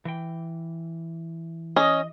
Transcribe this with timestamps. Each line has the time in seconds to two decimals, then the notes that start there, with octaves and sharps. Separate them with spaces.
0.05 E3 G5
1.76 C#4 D#5